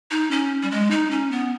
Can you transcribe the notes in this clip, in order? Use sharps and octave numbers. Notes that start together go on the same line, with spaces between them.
D#4
C#4
G3
G#3
D#4
C#4
B3